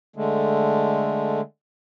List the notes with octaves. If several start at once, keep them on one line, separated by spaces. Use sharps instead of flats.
D3 G#3 A3